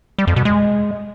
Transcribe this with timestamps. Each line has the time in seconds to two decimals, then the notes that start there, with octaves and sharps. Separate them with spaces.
0.18 G3
0.27 F2
0.36 B2
0.45 G#3